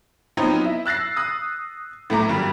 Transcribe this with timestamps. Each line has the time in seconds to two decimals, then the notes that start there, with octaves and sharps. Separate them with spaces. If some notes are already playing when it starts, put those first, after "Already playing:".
0.37 F3 F#3 B3 C4 D#4 F4
0.64 E4
0.86 E6 F#6 A6 A#6 C7
1.17 D#6 F#6
2.10 A2 A3 A#5 D6
2.28 G#1 G2 G3